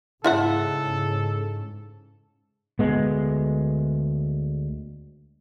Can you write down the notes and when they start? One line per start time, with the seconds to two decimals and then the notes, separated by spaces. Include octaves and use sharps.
0.24 G#2 C#3 E4 F4 A4 E5 F#5
2.79 D2 G#3 B3